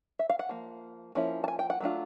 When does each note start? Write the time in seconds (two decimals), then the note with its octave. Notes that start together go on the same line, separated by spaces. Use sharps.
0.19 E5
0.30 F5
0.39 F#5
0.49 F3 A#3
1.15 F3 A#3 C#4 E4
1.44 A5
1.48 G#5
1.59 G5
1.70 F#5
1.80 F#3 A3 D4 F4